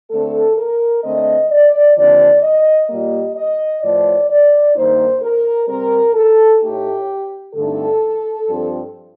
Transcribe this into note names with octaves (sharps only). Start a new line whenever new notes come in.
D3 A3 C4 A4
A#4
D3 A3 C4 D#5
D5
D#2 D3 F3 C4 D5
D#5
A#2 G3 A#3 D#5
D#5
A2 F3 A3 D5
D5
G2 D#3 A#3 D#4 C5
A#4
C3 G3 C4 A#4
A4
A2 A3 D#4 G4
G2 D3 A3 C4 D#4 A4
G2 F3 C4